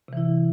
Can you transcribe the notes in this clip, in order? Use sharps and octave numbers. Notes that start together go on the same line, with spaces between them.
C3 E3 E4